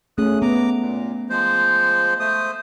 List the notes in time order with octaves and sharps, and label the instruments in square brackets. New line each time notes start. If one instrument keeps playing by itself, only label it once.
[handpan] A3 C#4 G#4 [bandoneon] D#6 F#6
[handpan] B3 [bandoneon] A#5 D6
[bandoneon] A#2
F3 G#3 C5
A3 C5 D#6